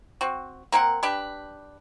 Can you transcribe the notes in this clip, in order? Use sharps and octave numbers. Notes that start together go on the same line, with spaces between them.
C4 F#4
A#3 C4 A#4 F#5
D4 G4 B4